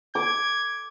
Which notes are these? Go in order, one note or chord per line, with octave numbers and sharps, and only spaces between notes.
D6 G#6